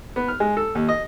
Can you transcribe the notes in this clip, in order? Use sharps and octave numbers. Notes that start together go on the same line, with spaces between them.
B3
F6
G#3
A4
D#2
D#5